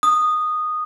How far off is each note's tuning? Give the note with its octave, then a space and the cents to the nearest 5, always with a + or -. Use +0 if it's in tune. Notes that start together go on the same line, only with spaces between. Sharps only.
D#6 -10